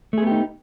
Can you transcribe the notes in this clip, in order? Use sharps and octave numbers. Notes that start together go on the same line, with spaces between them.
A3 B3 D#4 G4 G#4